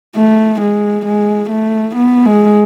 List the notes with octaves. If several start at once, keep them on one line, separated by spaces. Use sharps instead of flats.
A3
G#3
G#3
A3
B3
G#3